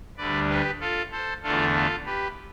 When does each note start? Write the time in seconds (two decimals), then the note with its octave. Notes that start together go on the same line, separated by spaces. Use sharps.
0.17 D2 D3 G3 B4 D5
0.49 G4 B4
0.80 F4 A4
1.11 A4 C5
1.42 E2 D3 A3 D4 F4 A4
1.73 F4 A4
2.06 G4 B4